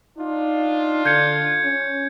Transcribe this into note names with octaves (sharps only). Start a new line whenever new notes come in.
D4 D#4 F4
D3 G6 G#6 C#7
C#4